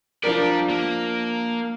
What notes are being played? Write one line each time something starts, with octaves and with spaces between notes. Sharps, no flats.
F3 D4 G4 A#4 D5
A#3